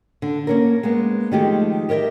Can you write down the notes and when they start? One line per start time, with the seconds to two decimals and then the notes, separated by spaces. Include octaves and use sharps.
0.22 D3
0.47 A#3 C#4 A#4
0.83 G#3 A#3 B3
1.32 D#3 F3 G#3 A3 G4
1.89 G4 A#4 C#5 D#5 E5